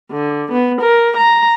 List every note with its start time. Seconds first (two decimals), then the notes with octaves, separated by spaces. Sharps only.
0.10 D3
0.51 B3
0.82 A#4
1.16 A#5